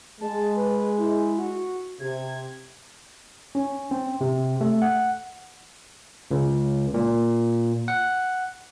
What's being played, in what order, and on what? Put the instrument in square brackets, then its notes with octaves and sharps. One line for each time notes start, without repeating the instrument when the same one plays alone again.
[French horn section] G#3 [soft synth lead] A5
[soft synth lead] B4
E4
F#4
[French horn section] C3 [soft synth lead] G#6
[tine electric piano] C#4
C4
C3
A3
F#5
C#2
A#2
F#5